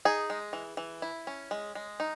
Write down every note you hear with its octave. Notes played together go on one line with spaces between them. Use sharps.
D#4 G#4
G#3
E3
E3
E4
C#4
G#3
G#3
D#4